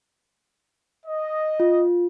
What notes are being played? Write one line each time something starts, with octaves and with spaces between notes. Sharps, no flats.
D#5
F4